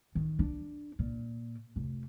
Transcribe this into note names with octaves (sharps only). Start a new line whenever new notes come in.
D#3
D4
A#2
F1